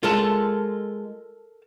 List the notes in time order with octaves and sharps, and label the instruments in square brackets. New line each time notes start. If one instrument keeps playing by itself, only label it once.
[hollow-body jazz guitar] G#3 F4 [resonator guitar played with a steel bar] A4 A#4 A5